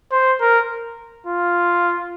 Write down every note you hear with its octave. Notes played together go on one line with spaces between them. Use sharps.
C5
A#4
F4